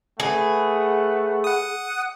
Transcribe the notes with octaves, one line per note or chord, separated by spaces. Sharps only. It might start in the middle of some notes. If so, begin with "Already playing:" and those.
A3 G#4 B4 F#5
F#5 D#6